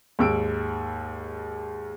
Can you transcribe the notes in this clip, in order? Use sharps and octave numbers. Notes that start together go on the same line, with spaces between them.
D#2 G#2 E6 D7